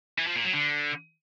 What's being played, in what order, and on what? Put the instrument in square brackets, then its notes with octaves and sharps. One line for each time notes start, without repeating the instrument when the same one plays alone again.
[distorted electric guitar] E3
F3
A#2
F#3
D3